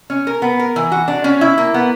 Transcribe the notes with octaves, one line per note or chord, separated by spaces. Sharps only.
C#4
A#4
B3
A#4
E3
F#4
D4
C#4
E4
A#3
B3